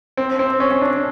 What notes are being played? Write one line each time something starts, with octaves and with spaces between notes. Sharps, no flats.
C4
C4
C#4
C#4
D4